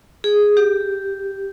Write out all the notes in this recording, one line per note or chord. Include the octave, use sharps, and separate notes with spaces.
G#4
G4